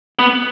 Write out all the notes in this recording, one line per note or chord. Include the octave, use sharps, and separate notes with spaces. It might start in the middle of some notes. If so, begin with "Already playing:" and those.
B3